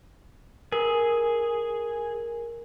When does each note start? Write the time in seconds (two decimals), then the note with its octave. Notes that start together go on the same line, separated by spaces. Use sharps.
0.72 G#4 A#4